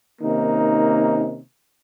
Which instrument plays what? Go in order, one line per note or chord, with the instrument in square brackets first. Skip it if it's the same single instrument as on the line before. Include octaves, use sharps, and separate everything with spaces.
[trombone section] C3 D#3 A#3 C#4 D#4